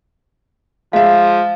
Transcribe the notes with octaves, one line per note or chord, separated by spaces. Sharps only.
F3 G#3 E5 F5